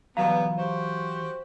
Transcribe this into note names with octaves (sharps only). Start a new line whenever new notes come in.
B2 E3 F#3 G3 B3 F5 A#5
F#4 G4 C5